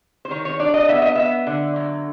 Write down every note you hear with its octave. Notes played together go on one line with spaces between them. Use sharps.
C5
D#3 C#5
C#5
D4 D5
D#5
B3 E5
D#5
B3 E5
D3
F#3